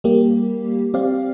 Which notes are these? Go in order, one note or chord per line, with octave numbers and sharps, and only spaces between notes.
G3 A#3 G4
C4 G4 D5 F5